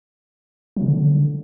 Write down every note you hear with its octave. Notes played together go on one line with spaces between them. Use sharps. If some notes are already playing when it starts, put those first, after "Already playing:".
F#3
C#3
D3